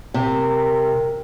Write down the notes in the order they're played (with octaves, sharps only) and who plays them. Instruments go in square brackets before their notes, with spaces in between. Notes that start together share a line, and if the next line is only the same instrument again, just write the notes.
[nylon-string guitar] C3 [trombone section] A#4